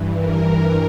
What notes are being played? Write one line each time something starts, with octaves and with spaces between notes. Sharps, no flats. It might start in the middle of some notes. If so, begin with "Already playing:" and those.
Already playing: G2 E3
A#4